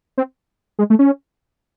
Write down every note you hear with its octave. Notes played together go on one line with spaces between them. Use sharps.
C4
G#3
A3
C#4